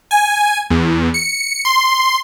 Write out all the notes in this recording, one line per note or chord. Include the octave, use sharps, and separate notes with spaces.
G#5
E2
C#7
C6